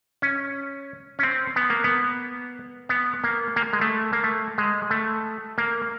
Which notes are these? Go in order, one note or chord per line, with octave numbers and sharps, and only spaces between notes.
C#4
C#4
C4
B3
A#3
B3
B3
A#3
A#3
G#3
A3
A#3
A3
G#3
A3
A#3